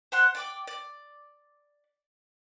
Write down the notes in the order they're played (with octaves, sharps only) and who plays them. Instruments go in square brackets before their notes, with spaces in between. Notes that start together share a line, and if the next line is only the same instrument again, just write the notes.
[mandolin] C5 F#5 C6 F#6
D5 G5 D6
D5